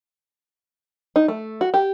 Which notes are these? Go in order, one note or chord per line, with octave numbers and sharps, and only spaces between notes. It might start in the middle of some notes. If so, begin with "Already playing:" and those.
D#4
A3
F#4
G4